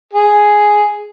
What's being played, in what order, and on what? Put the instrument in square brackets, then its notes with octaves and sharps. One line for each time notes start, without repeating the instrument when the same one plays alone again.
[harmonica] G#4